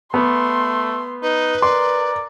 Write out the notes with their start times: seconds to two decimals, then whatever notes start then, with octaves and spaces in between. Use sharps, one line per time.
0.14 A3 B3 C6
1.23 D#4 B4
1.62 A#4 D5 C6